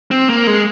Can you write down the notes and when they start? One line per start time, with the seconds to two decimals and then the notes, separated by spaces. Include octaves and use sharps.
0.11 C4
0.30 A#3
0.47 G#3